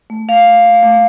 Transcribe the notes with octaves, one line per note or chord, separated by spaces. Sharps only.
A3
A3 F5
A3
A3
A3